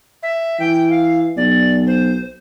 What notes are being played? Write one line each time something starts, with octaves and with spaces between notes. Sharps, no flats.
E5
E3 G5
F5
B1 D5
C5